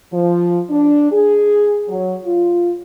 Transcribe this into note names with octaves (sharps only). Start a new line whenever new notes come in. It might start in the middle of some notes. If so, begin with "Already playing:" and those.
F3
D4
G#4
F#3
F4